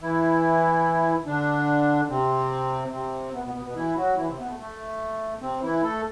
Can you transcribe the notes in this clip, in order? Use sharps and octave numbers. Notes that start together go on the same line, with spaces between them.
E3 E4
D3 D4
C3 C4
C3 C4
B2 B3
B2 B3
B2 B3
B2 B3
E3 E4
F#3 F#4
E3 E4
C3 C4
B2 B3
A3
A3
C3 C4
E3 E4
A3 A4